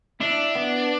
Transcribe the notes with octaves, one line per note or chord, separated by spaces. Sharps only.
D4 E4
B3